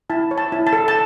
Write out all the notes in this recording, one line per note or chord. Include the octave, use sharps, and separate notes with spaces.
E4 A5
C#5
A5
E4
A5
A4
A5